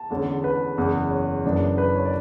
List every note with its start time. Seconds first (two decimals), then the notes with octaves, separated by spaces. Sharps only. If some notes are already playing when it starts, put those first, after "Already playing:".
Already playing: A5
0.10 E2 D3 G#3 C#4
0.44 B4
0.77 F#1 E2 C#3
1.11 C#5
1.44 F#1 F#2 E3 B3 D4
1.78 B4
1.95 C#5
2.05 D5